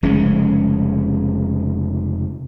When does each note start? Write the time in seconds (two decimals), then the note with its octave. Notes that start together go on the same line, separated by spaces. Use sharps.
0.03 F1 C#3 G#3 C#4